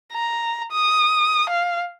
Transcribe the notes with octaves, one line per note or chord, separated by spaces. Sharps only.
A#5
D#6
F5